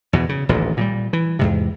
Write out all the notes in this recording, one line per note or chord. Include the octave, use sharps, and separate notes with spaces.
E2 B2 E3
C#3
D#1 A1 D2 A#2
A#2 F#3 G3
E3
E2 G#2 C3